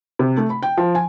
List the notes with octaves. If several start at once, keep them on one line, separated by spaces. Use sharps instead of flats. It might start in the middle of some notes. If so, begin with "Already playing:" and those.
C3
A3
B5
G5
F3
G#5